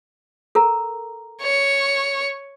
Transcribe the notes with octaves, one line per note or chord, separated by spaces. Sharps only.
A4 A#4 A#5
C#5